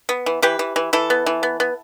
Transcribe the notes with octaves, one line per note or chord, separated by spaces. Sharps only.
B3
E3
E3 G4 B4
E3
E3
E3 E4 A4
B3
E3
B3
B3